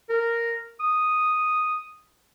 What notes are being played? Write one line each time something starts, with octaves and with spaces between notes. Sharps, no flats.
A#4
D#6